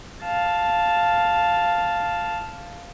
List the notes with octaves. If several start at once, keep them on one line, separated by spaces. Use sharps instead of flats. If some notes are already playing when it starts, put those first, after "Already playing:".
F5 A5